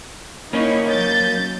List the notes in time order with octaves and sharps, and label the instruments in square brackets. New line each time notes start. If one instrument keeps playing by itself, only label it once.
[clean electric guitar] A#3 C#4 [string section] D#4 E4 C#5
[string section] F#3 G6 A6